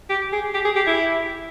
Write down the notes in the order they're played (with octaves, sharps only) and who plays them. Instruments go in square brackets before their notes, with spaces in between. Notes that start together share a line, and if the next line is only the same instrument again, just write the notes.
[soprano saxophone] G4
G#4
G4
G#4
G4
E4